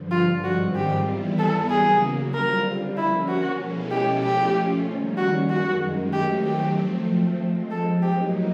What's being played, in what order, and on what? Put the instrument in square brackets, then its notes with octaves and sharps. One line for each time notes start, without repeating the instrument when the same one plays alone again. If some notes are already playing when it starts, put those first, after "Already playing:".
Already playing: [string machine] G2 D3 F3
[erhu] F4
[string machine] G#2 D#3 G3 C4 F4 [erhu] F#4
[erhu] G4
[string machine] E3 G3 B3 E4
[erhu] A4
[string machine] C#3 F#3 A#3 [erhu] G#4
[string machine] D3 G3 C4 F4 [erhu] A#4
[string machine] F3 A#3 C#4 [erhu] E4
[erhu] F#4
[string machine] B2 G#3 C#4 E4 A4
[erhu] G4
[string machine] F3 A3 C#4 F4 [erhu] G4
[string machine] D#3 G3 A#3 C#4
[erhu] F#4
[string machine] F#2 D#3 G#3 [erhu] F#4
[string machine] D#3 F#3 A3 C4 [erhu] G4
[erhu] G4
[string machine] F3 A3 C4
F3 G#3 C4
[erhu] A4
[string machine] A2 F#3 A#3 D#4 [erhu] G4